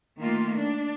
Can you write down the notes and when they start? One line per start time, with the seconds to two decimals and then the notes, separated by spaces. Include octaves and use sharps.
0.20 D#3 A3 A#3 F4
0.55 D4